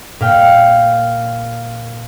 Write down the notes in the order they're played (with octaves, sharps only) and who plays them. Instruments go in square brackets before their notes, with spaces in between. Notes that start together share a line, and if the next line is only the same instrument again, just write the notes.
[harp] A#2 F5 G5